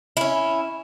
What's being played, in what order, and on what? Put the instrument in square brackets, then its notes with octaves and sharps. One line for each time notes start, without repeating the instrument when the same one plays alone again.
[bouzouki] C#4 E4